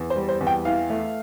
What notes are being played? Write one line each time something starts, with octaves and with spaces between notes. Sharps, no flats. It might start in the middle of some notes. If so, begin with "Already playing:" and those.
Already playing: E2
C5
G3
C5
E2
G5
E3 F5
A3